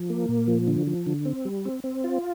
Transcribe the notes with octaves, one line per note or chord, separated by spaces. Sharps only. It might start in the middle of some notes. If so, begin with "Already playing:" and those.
Already playing: F3
A#3
A#2
F3
D3
F3
D3
C4
G3
C4
C4
F4